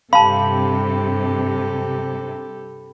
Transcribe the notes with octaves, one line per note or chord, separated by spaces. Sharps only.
G2 C3 G4 A4 F5 A5 B5